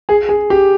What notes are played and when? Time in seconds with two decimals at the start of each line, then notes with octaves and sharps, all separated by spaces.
0.09 G#4
0.29 G#4
0.50 G4